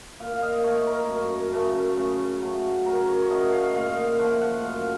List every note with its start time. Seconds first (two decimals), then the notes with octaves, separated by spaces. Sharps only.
0.20 A#2 F5
0.36 F5
0.42 D#5
0.64 A3 C#5
0.87 A#4
1.09 F#2
1.53 C#3 A3
1.97 C#3
2.42 F#3 A3
2.86 C#3 A#4
3.08 C#5
3.22 C#5
3.30 A3 D#5
3.52 F5
3.74 A#2 F5
3.97 F5
4.18 F3 A3 F#5
4.41 F#5
4.63 F#2 F5